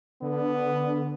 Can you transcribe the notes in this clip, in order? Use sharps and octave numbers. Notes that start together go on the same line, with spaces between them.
D3 B3